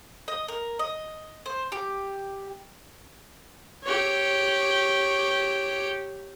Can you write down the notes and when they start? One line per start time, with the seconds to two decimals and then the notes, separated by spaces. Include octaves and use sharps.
0.28 D#5
0.48 A#4
0.79 D#5
1.46 C5
1.72 G4
3.84 G4 C#5